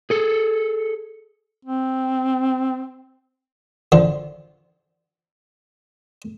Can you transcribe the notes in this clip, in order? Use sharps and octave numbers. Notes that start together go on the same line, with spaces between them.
G#4 A4
C4
D3 F3